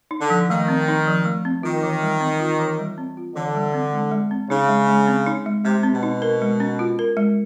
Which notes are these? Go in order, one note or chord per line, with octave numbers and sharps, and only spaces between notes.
D#4
D3
F3
D#3 A3
C4
D#4
F3
A3
C4
D#3 F4
E3
G3
C4
F4
E3
G3
C4
F4
D3 E3
G3
C4
G#3
G#3
C4
C#3 D#4
G#3
G#3
C4
D#4
G#3
C3 G#3
C4
B2
D#4
A#4
G#3
C#4
F4
A#4
G#3